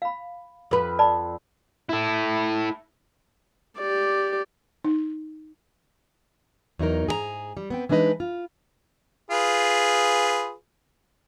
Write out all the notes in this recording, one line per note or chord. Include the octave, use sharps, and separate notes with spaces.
F5 B5
F2 B4
D5 A5 B5
E4 A4
G4 D5
D#4
E2 F#3 D#4 A#4
G#2 G#4 A4 A#5
G3
B3 C4 G5
E3 G#3 D4 D#4 B4 D#5
F4
F4 G#4 B4